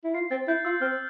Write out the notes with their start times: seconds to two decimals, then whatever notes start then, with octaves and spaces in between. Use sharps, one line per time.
0.04 E4
0.14 F4 C7
0.31 C4 A6
0.48 E4 G6
0.65 F4 E6
0.81 C4 F6